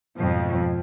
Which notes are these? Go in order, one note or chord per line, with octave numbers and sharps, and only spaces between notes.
F2 G#2 B2 F3